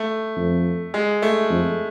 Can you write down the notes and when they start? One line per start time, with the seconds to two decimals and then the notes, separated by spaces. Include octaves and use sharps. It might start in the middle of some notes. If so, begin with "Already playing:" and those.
Already playing: A3
0.37 F2
0.94 G#3
1.22 A3
1.51 F2